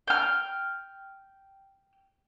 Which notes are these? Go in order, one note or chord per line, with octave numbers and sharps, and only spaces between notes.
G5 F6